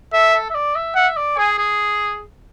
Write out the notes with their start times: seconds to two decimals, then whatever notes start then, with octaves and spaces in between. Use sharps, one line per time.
0.13 A4 E5
0.33 A4
0.50 E5
0.54 D5
0.75 E5
0.96 E5 F#5
1.16 D5
1.37 G#4 G#5
1.58 G#4